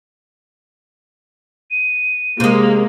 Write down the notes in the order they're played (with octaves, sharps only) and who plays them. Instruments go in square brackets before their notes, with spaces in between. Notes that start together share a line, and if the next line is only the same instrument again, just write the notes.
[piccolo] D#7
[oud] C3 G#3 [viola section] A#3